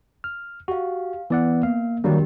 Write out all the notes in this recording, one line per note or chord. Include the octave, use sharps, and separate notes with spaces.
F6
F#4 G4 F5
E3 B3 D5 F#5
A#3 F5
D#3 F#3 G3 A#3 D4 F#4 G4